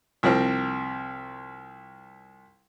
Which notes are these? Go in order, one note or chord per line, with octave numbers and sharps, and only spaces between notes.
C2 F3 C4